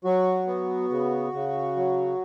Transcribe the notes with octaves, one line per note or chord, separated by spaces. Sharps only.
F#3 F#4
B3
C#3
C#3
F#3